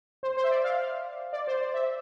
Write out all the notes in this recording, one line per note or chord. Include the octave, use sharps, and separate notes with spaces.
C5
C5
E5
D5
F5
D5
C5
D5
E5